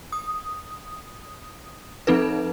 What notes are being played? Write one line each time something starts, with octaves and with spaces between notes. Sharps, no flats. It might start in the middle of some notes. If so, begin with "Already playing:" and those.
D#6
F3 C4 D#4 A4 B4